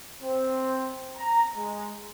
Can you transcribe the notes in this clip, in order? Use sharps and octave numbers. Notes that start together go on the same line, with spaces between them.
C4
A#5
G#3